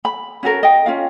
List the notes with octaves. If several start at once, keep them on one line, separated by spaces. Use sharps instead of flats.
B5
C#4 F#4 A4 A#4
D#5 G5
C#4 F4 F5